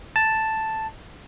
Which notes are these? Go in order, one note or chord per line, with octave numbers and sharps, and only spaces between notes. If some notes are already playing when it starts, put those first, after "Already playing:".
A5